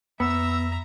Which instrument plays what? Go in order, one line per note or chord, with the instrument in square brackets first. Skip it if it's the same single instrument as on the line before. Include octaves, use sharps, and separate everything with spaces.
[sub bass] F2 [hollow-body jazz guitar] B3 [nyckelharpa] E5 A#5 [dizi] E6